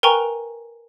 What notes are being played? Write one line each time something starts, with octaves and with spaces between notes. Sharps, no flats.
A#4 B4 G5 G#5 A#5 C#6